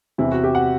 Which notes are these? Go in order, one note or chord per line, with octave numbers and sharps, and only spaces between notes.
E2 C3 E3 E4
F#4
G4
F#5